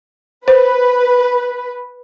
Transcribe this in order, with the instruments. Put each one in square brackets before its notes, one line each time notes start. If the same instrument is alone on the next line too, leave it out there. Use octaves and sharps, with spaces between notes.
[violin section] B4 [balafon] C5